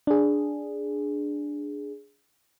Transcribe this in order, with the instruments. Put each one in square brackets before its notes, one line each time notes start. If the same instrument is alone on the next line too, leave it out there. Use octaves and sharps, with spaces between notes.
[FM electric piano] D4 G#4